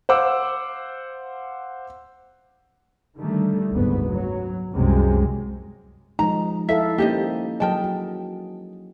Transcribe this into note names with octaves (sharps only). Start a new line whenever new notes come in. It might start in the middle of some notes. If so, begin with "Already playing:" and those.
C5 F5 F#5 D6 E6
D3 D#3 G3 A3
F#1 D2 G#2 B3
F#3
C2 F#2 C3 G#3
F3 G#3 D#4 A#5
E4 A4 E5 F5
A#3 C#4 D#4 G4 C5 D#5
F#3 G#4 A#4 D#5 G5 A5
F#4